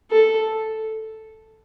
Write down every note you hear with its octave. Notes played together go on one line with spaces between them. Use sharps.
A4